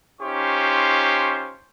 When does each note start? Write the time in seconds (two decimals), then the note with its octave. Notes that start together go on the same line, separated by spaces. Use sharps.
0.21 C#4 D#4 F4 G4 C5 C#6